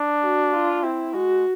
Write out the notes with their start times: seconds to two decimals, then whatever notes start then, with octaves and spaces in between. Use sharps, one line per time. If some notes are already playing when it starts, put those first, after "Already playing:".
Already playing: D4
0.23 F#4
0.53 F4
0.83 C4 E4
1.13 G#3 F#4